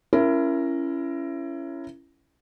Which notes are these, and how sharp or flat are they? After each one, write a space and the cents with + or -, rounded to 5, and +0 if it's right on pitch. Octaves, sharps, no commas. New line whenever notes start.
C#4 +0 E4 +25 A#4 +0